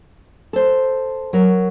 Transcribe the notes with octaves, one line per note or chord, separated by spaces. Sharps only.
A4 C5
F#3 A#4